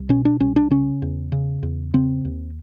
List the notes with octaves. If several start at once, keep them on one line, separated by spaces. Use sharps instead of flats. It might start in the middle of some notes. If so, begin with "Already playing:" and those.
Already playing: C2
B2 C#4
D4
C2 C#4
D4
C#3 C#4
E2
C#3
E2
C#3 C4
D#2